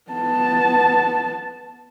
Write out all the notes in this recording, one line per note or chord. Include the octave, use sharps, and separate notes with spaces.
B3 A5